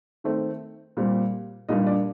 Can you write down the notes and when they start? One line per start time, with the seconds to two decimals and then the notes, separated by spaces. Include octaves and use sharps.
0.24 D#3 A3 C4
0.97 A#2 G3 C4
1.69 A#2 G3 A#3 D4 D#4 D#5
1.87 D4 D5